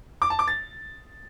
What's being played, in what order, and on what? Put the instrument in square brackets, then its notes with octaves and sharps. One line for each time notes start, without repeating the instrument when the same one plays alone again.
[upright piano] D6
A5
D6
A6